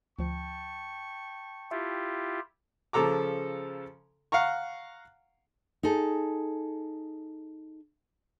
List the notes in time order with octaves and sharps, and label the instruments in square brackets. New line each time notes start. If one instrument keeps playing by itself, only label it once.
[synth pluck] D2 F3 [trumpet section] G5 A5 C#6
[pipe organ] E4 F4 G4 [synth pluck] E5
[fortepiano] C#3 F3 A4 A#5 D6
F5 F#5 A#5 C#6
[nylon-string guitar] D#4 G#4 A4